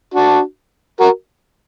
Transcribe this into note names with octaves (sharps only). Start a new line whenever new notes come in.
D4 F#4
F#4 A#4